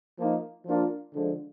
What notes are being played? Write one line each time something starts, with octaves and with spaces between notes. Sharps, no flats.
F3 A#3 D#4
F3 A#3 D4 F4
D3 F3 G#3 D4